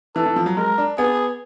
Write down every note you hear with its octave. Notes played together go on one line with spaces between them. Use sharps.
E3 A4
E3
F3
F#3
G#3 A#4
D4
B3 G#4